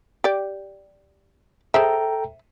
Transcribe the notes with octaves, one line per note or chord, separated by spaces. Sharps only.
G4 D5
G#4 A4 C5 E5 G5 A#5